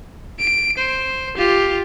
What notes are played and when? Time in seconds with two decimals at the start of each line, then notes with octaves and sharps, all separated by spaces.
0.39 D7
0.77 C5
1.37 F4 G4